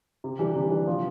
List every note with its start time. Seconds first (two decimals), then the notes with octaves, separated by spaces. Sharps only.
0.24 C3
0.39 E3 G3 D4
0.56 C3
0.71 E3 G3 D4
0.87 F3